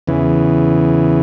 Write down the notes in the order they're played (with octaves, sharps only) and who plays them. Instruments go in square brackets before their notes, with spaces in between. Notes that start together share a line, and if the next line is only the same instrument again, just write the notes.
[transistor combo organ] E2 C#3 E3